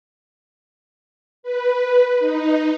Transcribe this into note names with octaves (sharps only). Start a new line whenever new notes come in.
B4
D#4